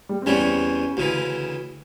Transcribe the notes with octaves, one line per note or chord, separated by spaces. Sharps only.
G3
C4
E2 C3 E3 G3 C#4
D2 C#3 E3